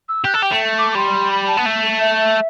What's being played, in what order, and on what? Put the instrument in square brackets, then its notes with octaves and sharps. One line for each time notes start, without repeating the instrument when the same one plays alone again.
[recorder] E6
[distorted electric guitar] G4 [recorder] F#6
[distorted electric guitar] A4
[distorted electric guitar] G4 [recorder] G5
[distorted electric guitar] A3
[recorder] D6
D6
[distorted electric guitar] G3 [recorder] C6
[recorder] B5
A5
[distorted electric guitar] B3
A3
[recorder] E5